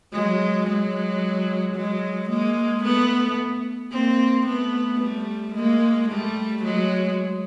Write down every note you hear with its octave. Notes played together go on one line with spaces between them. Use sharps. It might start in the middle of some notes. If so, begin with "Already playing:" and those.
F#3 G#3
F#3 G#3
F#3 G#3
G#3 A#3
A3 B3
A#3 C4
A3 B3
G3 A3
G#3 A#3
G3 A3
F#3 G#3